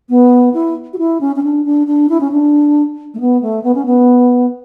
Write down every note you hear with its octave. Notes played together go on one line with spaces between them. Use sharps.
B3
E4
F#4
E4
C#4
C#4
D4
D4
D4
E4
C#4
D4
A3
B3
A3
B3
C#4
B3